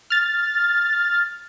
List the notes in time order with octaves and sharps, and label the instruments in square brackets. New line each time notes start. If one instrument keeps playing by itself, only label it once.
[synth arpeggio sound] F6 A6